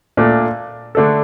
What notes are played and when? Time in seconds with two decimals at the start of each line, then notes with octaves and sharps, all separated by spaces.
0.17 A#2 A3 D4
0.95 D3 A3 D4 A4